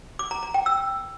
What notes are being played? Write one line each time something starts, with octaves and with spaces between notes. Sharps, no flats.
D6
A#5
A#5
G5
E6